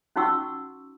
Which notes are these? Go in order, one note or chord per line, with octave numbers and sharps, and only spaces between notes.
C#4 D#4 F#4 F#5 C#6 E6